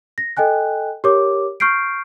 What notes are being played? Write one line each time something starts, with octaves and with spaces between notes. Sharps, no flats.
A#6
A4 D#5 G5 G#5 F#6
G4 A#4 C#5 D6
C#6 F6 G6 C7 D7